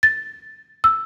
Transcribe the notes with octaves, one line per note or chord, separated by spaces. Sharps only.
A6
E6